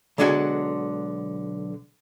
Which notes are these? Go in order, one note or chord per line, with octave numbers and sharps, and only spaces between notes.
B1 D3 G#3 D4 F#4 G#5